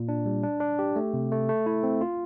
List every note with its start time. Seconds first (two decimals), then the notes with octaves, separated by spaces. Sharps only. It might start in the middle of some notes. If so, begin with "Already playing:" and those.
Already playing: A#2
0.09 D4
0.26 G3
0.43 D4
0.60 D4
0.79 G4
0.96 A3
1.14 C3
1.32 A3
1.49 A3
1.66 E4
1.83 C4
2.01 F4